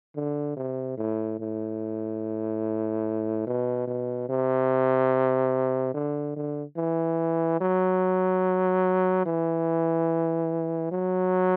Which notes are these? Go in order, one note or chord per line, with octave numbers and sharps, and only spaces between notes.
D3
C3
A2
A2
B2
B2
C3
D3
D3
E3
F#3
E3
F#3